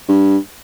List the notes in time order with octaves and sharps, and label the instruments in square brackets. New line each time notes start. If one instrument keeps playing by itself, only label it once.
[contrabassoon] G2